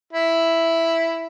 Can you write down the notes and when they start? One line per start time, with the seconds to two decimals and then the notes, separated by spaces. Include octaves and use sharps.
0.13 E4